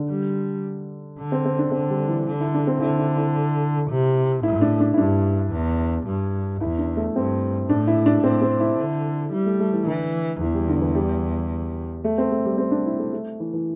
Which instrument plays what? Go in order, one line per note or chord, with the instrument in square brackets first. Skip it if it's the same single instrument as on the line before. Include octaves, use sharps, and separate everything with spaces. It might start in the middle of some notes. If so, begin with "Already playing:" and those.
Already playing: [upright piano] D3
[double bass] G3
D3
[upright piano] C4
C4
D4
[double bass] D3 [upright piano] C4
[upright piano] G3
E3
[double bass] D3
[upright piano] E4
D4
C4
[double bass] D3 [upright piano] E4
[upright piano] E4
E4
[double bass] C3
[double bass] A2 [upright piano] E4
[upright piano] D4
D4
E4
[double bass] G2 [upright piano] D4
[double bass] E2
G2
[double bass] E2 [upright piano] E4
[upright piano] D4
A3
[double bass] G2 [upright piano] C4
[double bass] A2 [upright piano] D4
[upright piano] E4
D4
[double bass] A2 [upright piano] C4
[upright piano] C4
E4
[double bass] D3
[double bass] G3 [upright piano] E4
[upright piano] A3
A3
E3
[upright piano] D3 [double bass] E3
[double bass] E2 [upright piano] E3
[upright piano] G3
D3
E3
G3
A3
C4
A3
G3
C4
D4
E4
A3
A3
E3
E3